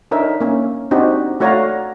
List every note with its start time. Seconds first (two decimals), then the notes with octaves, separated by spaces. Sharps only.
0.11 D4 D#4 A#4 C#5 E5
0.41 A#3 C#4
0.91 C4 D4 D#4 F#4 G4
1.40 A3 F#4 C#5 D5 F5 A#5